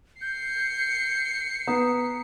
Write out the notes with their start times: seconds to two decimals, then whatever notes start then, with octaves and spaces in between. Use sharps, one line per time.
0.21 G6 C7 C#7
1.67 B3 A#5 D#6 B6